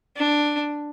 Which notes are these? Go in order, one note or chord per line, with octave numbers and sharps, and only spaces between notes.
D4